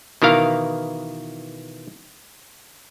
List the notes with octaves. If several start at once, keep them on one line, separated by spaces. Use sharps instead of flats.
B2 D#3 E3 A#4 F5